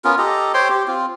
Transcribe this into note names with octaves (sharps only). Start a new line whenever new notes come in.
B3 C#4 F4 A#4
G4 A4 D#5 A#5
C5 C#5 G5 C6
G4
C4 F4